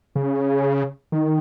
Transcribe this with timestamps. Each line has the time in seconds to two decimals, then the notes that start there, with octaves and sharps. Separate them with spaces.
0.15 C#3
1.12 D#3